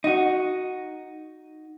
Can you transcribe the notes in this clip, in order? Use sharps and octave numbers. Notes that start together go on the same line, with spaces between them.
D#4 F#4